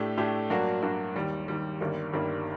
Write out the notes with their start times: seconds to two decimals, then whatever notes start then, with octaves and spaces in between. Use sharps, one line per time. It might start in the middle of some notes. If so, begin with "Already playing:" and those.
Already playing: A2 A3 D4 G4
0.18 A2 A3 D4 G4
0.50 G2 F#3 A#3 D4 F#4
0.82 G2 F#3 A#3 D4 F#4
1.15 D#2 D#3 G3
1.48 D#2 D#3 G3
1.80 G1 G2 D#3 G3 A#3
2.13 G1 G2 D#3 G3 A#3